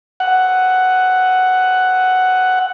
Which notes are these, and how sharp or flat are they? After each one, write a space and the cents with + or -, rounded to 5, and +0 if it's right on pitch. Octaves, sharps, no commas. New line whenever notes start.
F#5 +5